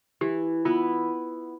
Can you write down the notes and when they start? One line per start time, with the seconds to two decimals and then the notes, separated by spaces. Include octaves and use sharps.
0.21 E3 G4
0.65 B3 E4 F4 B4